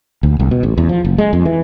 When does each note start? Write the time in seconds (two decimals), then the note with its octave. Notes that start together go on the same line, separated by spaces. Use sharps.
0.23 D2
0.40 C2
0.51 B2
0.63 A1
0.78 E2
0.89 F3
1.05 F#1
1.18 G#3
1.33 F2
1.45 E3